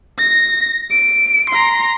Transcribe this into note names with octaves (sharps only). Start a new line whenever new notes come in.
A#6
D7
A#5 C6